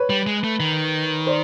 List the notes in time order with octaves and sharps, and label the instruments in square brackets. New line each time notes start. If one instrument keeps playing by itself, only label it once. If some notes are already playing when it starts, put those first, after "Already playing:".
Already playing: [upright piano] B4 C#5
[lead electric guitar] G3
G#3
A3
D#3
[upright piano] C5 D5